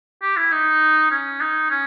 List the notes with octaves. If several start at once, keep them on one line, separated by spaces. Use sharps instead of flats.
G4
E4
D#4
C#4
D#4
C#4